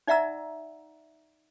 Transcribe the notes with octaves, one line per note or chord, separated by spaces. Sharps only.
D#4 D5 E5 F#5 A#5 E6